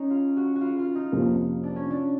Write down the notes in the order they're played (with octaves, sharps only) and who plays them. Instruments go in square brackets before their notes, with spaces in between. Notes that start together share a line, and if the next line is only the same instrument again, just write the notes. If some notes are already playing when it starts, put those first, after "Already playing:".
Already playing: [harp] C#4 D#4
F4
F#4
F#4
F4
F4
D#4
[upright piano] F2 C3 F3 A#3
[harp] D4
C#4
D4